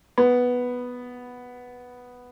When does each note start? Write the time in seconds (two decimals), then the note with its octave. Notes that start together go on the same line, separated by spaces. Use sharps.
0.18 B3